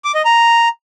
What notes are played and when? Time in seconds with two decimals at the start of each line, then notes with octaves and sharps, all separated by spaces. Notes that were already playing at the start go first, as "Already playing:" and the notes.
0.05 D6
0.15 D#5
0.25 A#5